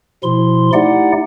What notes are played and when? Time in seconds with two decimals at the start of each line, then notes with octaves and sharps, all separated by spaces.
0.23 B2 F3 E4 C6
0.73 A3 D#4 E4 G4 D5 F#5